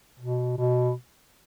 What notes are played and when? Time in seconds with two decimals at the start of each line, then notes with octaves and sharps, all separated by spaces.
0.19 B2
0.58 B2